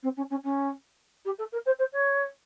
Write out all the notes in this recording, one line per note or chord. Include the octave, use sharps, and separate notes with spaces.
C4
C#4
C#4
C#4
G4
A4
A#4
C5
C5
C#5